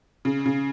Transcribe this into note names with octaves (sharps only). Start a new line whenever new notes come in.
C#3
C#3